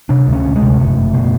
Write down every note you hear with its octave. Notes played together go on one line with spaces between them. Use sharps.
C3 D4
D2
C#4
D2
G#3
C3
F#1 A3
F#1
B2